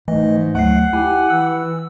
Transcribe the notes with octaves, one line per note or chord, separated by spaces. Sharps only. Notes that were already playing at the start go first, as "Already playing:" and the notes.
G#2 E3 A3 D#5
D2 F#3 A3 F#5 C7
E4 G4 G#5
E3 E6